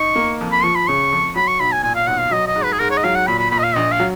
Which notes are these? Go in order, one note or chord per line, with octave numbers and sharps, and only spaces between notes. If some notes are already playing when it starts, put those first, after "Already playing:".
Already playing: D#4 C#6
A#3
F2
B5
F3 C#6
B5
C#3 C#6
F2
F#3 B5
C#6
B1 B5
G#5
A#2 G#5
F5
B1 F#5
F5
F#3 D#5
D#5
G#2
B4
G#4
G#2 A#4
C#5
D#5
F#3 F5
F#5
A#2 B5
B5
A#2 B5
D#5
F5
A#1 D#5
F5
F#3